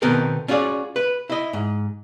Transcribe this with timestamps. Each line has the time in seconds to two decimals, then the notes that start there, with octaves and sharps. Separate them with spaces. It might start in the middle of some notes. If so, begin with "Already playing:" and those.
0.02 B2 D#3 B3 C4 A4 A#4
0.48 C#4 F4 F#4 G#4 D5
0.96 B4
1.30 E4 D#5
1.53 G#2